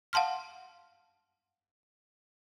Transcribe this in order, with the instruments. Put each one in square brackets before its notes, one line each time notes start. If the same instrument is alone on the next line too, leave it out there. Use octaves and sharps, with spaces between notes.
[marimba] F5 F#5 A5 C6 F6